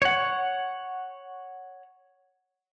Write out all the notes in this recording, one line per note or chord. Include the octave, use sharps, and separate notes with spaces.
C#5 F#5